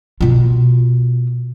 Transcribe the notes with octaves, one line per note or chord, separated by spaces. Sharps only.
B2 F4